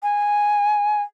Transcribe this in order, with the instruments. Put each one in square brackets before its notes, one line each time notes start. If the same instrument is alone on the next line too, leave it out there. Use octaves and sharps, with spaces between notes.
[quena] G#5